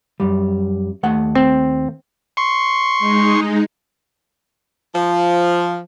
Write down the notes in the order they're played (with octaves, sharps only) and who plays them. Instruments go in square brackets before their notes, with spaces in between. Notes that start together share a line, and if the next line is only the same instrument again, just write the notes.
[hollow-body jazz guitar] F#2 G3
D#2 A3 F#5
[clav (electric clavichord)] C4
[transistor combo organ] C6 C#6
[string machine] G#3 D#4
[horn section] F3